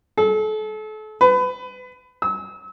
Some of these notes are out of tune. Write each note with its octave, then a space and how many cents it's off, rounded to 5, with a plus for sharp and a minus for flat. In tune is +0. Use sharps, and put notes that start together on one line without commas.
A4 -35
B4 +25
E6 -35